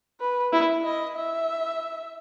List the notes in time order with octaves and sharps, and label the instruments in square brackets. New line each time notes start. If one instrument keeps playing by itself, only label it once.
[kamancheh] B4
[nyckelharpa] E4
[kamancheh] D#5
E5